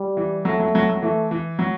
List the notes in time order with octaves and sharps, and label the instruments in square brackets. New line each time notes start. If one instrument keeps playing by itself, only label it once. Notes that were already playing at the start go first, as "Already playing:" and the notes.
Already playing: [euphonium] G3
[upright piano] E3
[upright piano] F#3 [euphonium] A3
[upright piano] F#3
F#3
F#3
[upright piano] E3 [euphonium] A3
[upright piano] E3
F#3